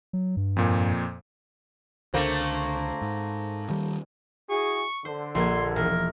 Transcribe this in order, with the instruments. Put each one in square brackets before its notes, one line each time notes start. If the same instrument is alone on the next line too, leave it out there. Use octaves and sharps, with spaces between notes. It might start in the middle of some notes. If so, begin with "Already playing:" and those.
[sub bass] F#3
G2
[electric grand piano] F2 A#2
[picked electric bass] C#2 D3 [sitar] A3 A#3 C4
[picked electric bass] G#2
D#3 G3
[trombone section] E4 F#4 G#4 [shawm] C#6
[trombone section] D3 [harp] C5
[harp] A#1 A#3 G#6 [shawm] C6
[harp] E1 [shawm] A#4